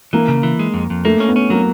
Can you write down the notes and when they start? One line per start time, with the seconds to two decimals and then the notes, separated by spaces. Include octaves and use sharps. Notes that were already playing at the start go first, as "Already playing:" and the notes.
0.13 E3 A#3
0.28 C#3
0.43 E3
0.59 G#3
0.74 F2
0.90 F2
1.05 A3 A#3
1.20 C#4
1.28 B3
1.36 C#4
1.50 F#3 A#3